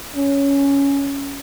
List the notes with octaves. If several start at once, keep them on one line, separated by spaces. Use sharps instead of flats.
C#4